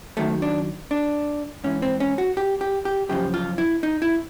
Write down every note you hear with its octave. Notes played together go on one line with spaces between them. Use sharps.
F#2 D#3 F#3 A3
D4
D4
G#2 E3 C#4
C4
C#4
F#4
G4
G4
G4
F#2 C#3 F3 G4
F4
E4
D#4
E4